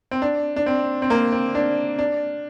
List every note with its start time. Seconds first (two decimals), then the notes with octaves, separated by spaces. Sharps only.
0.11 C4
0.22 D4
0.56 D4
0.66 C4
1.02 C4
1.10 A#3
1.32 C4
1.55 D4
1.99 D4